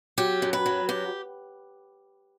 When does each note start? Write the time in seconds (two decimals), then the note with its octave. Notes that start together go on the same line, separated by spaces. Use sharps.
0.18 F#3 G4
0.42 F#2
0.53 B4
0.66 F#3
0.89 F#2 G4